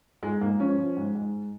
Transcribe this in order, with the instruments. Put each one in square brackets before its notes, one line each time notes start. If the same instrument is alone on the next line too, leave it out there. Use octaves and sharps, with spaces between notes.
[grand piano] G#2 G#3
G#2 A#3
F3 C#4
F3
G#2
G#2